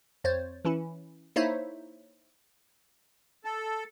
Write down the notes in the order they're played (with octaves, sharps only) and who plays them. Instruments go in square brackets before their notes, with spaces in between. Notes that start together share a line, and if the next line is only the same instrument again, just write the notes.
[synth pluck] F2 C5 C#5 A6
E3 C#4 E4
A#3 D#4 E4 C5 C#5 E5
[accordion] A4